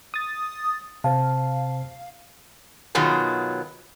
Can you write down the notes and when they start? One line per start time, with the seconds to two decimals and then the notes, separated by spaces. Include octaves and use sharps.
0.14 D#6 A6
1.04 C3 C5 F5 A5
2.95 B2 D#3 F#3 F4 G#4